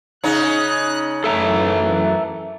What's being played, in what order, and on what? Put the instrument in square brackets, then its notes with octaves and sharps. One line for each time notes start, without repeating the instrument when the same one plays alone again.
[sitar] C#3 D#4 [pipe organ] F#6
[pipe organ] F#2 E3 [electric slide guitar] A4 E5 A#5